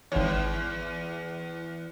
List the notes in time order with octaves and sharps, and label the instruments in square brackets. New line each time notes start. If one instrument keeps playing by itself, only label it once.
[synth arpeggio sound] G#1 C#5 [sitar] E2